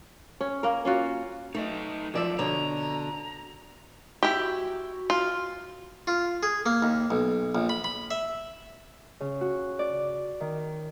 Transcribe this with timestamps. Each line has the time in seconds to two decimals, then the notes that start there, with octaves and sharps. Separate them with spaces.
0.41 C#4
0.63 A#3 A#4
0.85 C#4 F4 F#4
1.55 A3 D#4 B4 D#5
2.14 F2 F3 F#3 D5 E5
2.39 B2 D3 C#5 A#5
4.23 E4 F#4 G4
5.10 F4
6.07 F4
6.43 G#4
6.66 A#3
6.82 D#2
7.11 B1
7.55 A#1
7.69 B5
7.84 B5
8.11 E5
9.20 C#3
9.41 F#4
9.79 D5
10.40 D#3